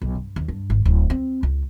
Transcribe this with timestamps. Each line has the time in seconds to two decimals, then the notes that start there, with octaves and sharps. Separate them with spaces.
0.02 B1
0.15 G2
0.36 D#2
0.48 G2
0.70 G#1
0.85 D1
1.10 C4
1.43 C#2